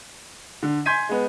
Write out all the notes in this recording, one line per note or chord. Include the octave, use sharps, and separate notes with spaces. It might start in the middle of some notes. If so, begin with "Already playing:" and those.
D3
G#5 C6 G6 G#6 B6 D#7
G#3 B3